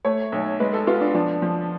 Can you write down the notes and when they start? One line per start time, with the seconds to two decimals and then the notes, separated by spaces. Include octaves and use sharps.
0.05 A3 C#5
0.32 B1
0.60 G#3 B4
0.73 A4
0.87 B3 F4
1.01 D4
1.15 F3 D4
1.42 F3